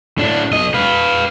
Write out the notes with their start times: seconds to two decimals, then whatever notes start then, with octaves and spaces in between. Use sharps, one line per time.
0.18 A2 D4
0.51 B1 D#5
0.74 B4 F5